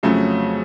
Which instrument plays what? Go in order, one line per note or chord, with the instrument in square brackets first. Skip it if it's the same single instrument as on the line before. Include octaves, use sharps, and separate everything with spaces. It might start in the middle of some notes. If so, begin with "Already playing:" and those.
[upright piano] F2 C#3 F#3 A3 C#4